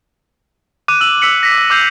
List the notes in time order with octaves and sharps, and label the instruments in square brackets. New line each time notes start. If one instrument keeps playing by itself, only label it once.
[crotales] D6 F#6 D#7
E6 F#7
E6 B6 C#7 F#7
A#6 B6
D6 E6 G6 C7 F7